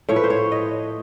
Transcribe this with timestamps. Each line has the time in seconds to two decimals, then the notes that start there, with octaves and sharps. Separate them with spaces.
0.09 A2 F3 C#5
0.16 B4
0.24 C5
0.30 C#5
0.52 D#5